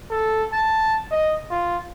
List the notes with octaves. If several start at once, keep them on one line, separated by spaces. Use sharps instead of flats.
A4
A5
D#5
F4